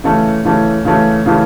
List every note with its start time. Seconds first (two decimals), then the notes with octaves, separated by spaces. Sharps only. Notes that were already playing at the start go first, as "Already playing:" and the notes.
0.04 C#3 E3 A3 C#4
0.45 C#3 E3 A3 C#4
0.85 C#3 E3 A3 C#4
1.26 C#3 E3 A3 C#4